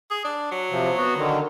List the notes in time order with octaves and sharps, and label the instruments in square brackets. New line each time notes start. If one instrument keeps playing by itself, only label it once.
[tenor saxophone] G#4
D4
F#3
[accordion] C3 F3
B3 F#4
D3 D#3